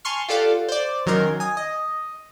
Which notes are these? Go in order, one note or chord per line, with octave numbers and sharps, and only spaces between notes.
G#5 A5 C6 C#6 F6
F4 G4 A4 D5 F5 F#5
C5 D5
D#3 F#3 C#4 D#4 A#4 C6
G#5 D#6
D#5